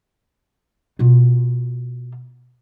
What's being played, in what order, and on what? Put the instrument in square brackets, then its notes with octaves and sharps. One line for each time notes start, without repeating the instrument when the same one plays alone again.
[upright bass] B2 F4